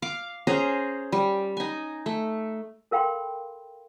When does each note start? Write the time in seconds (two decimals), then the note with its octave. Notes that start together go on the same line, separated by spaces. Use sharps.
0.02 F5 D6
0.47 C#4 G#4 C5 A#5
1.12 G3
1.57 D#4 G#5
2.06 A3
2.91 A4 A#4 F5 G5 B5 C6